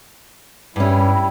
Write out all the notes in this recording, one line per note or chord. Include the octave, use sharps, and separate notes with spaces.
G2 G3 C#4 E4